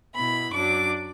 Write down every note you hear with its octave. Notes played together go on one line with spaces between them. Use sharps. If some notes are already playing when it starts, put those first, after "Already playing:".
B2 B3 E4 B5
F#2 F#3 D4 D6